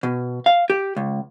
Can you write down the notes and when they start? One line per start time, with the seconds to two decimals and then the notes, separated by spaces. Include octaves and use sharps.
0.03 B2
0.46 F5
0.70 G4
0.96 C#2